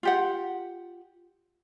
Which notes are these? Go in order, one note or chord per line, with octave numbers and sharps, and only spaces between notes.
F4 G4 F#5